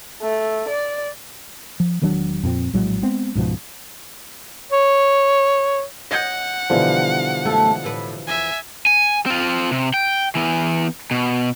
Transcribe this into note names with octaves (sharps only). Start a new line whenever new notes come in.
A3
D5
F3
E1 D#3 F#3 D4
F2 A#2 C4
A#1 A2 F#3 G#3
G#3 B3 C4
C#2 G#2 B2 F3
C#5
D#5 F#5 G6 G#6 A#6
B2 D3 E3 F3 G3
F#2 A3 A4
A2 B4
E2 E5 G#5
G#5
C4 F4
C3
G5
E3 B3
B2